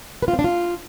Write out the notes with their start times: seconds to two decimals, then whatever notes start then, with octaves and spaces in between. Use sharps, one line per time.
0.22 B4
0.28 F4
0.33 C4
0.39 D4
0.44 F4